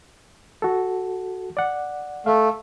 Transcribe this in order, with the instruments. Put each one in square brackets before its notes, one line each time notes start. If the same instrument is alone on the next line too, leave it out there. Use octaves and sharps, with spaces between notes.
[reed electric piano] F#4 A4
D5 F#5
[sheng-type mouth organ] A3 [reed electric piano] F5